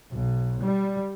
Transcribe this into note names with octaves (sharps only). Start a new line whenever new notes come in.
B1
G3